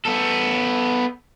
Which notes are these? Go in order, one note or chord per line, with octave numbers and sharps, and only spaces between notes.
B3 A4